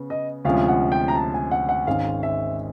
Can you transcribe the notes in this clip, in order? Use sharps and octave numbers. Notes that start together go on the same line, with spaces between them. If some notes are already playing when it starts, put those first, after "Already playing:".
Already playing: C#3 B3
D#5
D2 C3 F3 G#3 C#4 F5
F#5
G5
A#5
A5
G#5
F#5
F#5
G#1 G#2 D#3 G#3 C#4 F5
E5